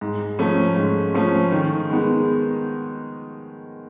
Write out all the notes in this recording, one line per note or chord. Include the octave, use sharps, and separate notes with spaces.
G#2
F3 A3 C#4
G#2
F3 A3 C#4
D#3
G#3 B3 D#4